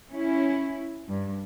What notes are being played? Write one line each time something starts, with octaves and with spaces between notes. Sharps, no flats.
C#4 E4
G2